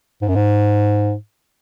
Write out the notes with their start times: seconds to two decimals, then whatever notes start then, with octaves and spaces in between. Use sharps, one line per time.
0.21 G#2
0.28 F#2
0.36 G#2